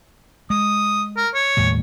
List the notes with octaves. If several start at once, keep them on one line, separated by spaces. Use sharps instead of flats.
G#3 D#6
A#4
C#5
D#2 A2 G3